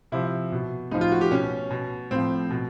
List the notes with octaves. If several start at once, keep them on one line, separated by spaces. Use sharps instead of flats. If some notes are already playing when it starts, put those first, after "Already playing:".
C3 F3 E4
B2
A2 F3 D#4
F4
F#4
G4
B2 C#4
B2
A2 F3 C4
B2